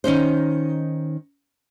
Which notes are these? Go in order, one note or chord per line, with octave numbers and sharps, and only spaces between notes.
D#3 C#4 D#4 C5